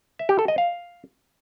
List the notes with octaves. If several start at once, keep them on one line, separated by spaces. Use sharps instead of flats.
E5
G4
A4
D#5
F5